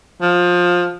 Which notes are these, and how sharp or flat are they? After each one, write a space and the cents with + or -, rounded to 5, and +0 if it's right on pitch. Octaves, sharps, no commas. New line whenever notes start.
F3 +20